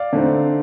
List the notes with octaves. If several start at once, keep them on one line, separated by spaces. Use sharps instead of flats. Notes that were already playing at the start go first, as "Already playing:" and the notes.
Already playing: D5 F5
D3 A3 C4 D#4